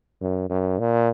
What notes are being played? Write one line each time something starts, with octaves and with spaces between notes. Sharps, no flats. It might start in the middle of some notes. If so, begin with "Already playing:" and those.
F#2
F#2
A#2